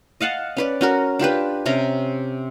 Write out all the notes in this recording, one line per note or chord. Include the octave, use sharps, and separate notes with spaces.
D#5 F5 F#5 A5
C#4 B4 D5
C#4 F#4 A#4
D4 F4 G4 B4
C3 C#4 A#5